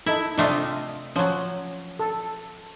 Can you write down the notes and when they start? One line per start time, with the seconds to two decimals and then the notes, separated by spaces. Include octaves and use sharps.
0.06 D#4 E4 A4
0.38 C3 A3 D4 F4 D#5
1.16 F3 F#3 C#4
1.99 A4